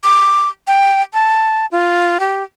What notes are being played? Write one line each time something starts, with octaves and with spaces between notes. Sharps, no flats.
D6
G5
A5
F4
G4